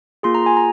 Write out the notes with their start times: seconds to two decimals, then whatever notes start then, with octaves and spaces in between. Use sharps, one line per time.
0.23 A#3 F4 G#4 C6
0.35 A#5
0.46 G#5
0.57 A#5